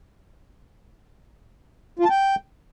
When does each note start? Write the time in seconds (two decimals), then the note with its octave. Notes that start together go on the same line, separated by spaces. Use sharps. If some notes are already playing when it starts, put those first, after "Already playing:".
1.99 F4
2.05 A5
2.10 G5